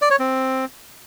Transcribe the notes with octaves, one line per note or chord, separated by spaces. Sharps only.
D5
C#5
C4